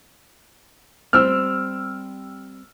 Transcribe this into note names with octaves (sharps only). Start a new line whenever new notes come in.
G3 C4 G4 E6 F6